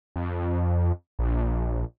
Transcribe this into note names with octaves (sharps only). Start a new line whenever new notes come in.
F2
A#1